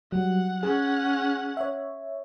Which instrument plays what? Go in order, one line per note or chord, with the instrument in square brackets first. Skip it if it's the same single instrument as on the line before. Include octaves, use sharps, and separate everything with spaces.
[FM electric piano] F#3 G3 [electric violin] F#5
[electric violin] C#4 F#5 [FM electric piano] G#4
[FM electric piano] C#5 E5